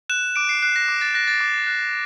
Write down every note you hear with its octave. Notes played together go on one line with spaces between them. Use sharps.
F#6 E7
D6 D7
C7
F#6 C7
A#6
D6
A6
F#6 A#6
A6
D6
F#6